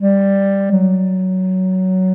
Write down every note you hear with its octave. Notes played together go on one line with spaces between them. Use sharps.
G3
F#3